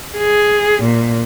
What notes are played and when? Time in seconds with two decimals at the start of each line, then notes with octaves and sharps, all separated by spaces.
0.18 G#4
0.82 A#2